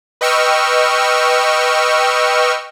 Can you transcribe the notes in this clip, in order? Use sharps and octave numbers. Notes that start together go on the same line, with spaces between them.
B4 D#5 G5 C#6 E6 F6